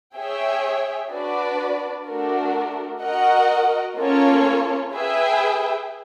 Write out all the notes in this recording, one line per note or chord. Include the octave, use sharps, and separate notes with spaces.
G#4 C#5 E5 G5
D4 F#4 B4 D5
A3 D4 F#4 A#4
F#4 A#4 D#5 F#5
A#3 C#4 F4 A4 C#5
G#4 B4 E5 G5